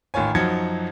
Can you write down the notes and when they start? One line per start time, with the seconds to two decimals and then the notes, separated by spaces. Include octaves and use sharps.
0.14 A1 D#3 F4 C#5 G#5
0.35 F#2 F3 F#3 D#4 G#6 C#7